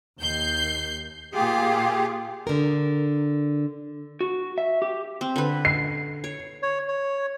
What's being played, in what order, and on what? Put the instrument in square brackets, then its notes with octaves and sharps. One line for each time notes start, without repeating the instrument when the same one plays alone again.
[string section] D#2 G6 C7
[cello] A#2 F4 [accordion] G4 G#4
[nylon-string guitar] D3 A#4
[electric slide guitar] F#4
E5
G4
[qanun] C4
D3 B4
[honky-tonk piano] C7
[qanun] C#5
[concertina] C#5
C#5